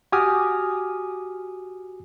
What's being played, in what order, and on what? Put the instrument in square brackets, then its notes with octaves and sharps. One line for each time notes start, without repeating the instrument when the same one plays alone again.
[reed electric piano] F#4 G4 G#5 D6 D#6 F6